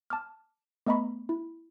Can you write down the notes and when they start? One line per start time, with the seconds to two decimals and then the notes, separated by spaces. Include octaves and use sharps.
0.10 A5 D6 F6
0.86 A3 B3 D#5 A#5 B5 C#6
1.29 E4